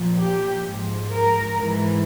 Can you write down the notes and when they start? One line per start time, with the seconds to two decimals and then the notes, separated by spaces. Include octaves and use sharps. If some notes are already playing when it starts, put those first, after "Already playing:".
Already playing: A#2 F3
0.19 G4
0.66 G#2 F3
1.13 A#4
1.59 G#2 E3